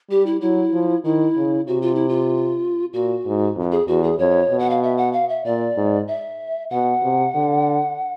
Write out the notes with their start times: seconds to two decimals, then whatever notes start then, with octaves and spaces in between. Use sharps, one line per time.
0.10 G3 G4
0.26 E4
0.41 F#3 E4
0.73 F3
1.04 D#3 E4
1.37 C#3
1.67 C3 F#4
1.82 F4
1.95 E4
2.09 F4
2.93 A#2 F#4
3.25 G#2
3.56 F2
3.72 G#4
3.87 E2 F#4
4.04 G#4
4.19 F2 C#5
4.51 B2
4.59 F#5
4.70 F5
4.83 E5
4.97 F#5
5.13 F5
5.29 E5
5.45 A#2 D5
5.77 G#2
6.08 E5
6.70 B2 F#5
7.03 C3
7.35 D3